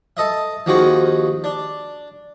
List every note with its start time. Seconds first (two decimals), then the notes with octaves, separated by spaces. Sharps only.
0.17 A4 D#5 E5
0.66 D#2 D#3 F3 F#4 G#4 C#6
1.44 D4